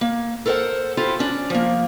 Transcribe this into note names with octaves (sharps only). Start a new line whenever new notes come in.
A#3
A4 A#4 C5 F5 F#5
E4 F4 G4 A4 C5
C#4 D4
F3 A#3